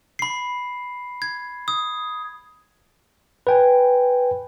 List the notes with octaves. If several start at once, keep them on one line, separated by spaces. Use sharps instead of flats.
B5 C7
G#6
D#6
B4 G5 G#5